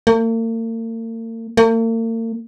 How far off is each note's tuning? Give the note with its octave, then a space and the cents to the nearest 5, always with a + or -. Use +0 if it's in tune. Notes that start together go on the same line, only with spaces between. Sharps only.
A#3 -45
A#3 -45